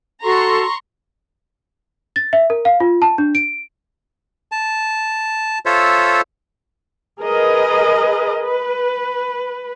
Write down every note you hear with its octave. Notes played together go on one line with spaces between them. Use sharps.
F#4 A4 A#5 C6 C#6
A6
E5
A#4
F5
F4
A5
D4
D7
A5
F4 A4 C5 C#5 E5
G#4 A#4 B4 D#5
B4